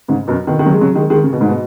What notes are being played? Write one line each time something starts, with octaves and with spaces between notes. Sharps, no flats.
G#2 C#3
F#2 B2
B2 D#3
D#3
C#3 F#3
G#3
C#3 F#3
D#3 G#3
D#3 G#3
C#3
B2
G#2
B2